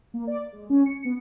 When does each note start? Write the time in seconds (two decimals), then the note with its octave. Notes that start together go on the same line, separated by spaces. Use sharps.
0.14 A#3
0.27 D5
0.53 G#3
0.70 C#4
0.86 C#7
1.05 B3